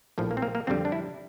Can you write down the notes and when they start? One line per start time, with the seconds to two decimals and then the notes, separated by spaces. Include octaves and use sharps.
0.18 A#1 A2 F3
0.31 A#3
0.37 C4
0.42 A#3
0.55 A#3
0.67 F2 D3 G3 C4
0.85 D4
0.92 E4